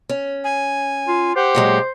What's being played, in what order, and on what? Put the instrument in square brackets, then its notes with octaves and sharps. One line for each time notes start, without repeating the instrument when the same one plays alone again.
[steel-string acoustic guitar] C#4
[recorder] G#5
[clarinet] F4
[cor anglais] G4 [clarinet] C5 [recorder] F#5
[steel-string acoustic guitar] A#2 F#3 G#3